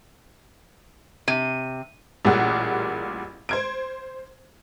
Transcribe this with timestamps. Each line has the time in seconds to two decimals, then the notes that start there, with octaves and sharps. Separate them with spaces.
1.28 C3 D#7
2.25 A1 A#2 G3 G#4 F#5
3.49 C5 G#6 D7